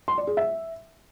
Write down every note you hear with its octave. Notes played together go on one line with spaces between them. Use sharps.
C6
D5
G#4
E5